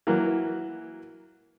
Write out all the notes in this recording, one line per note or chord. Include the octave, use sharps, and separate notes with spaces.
E3 F#3 A#3